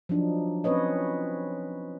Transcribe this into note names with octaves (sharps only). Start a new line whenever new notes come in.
F3 F#3 D4 D#4
C4 C#4 B4 C#5 D#5